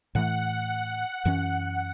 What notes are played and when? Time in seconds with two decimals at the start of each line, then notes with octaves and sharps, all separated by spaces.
0.15 A2 E3 A3 F#5
1.25 F#2 E3 C#4